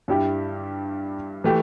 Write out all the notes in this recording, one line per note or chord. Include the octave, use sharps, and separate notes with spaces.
G2 G3 E4 G4
E3 A3 G4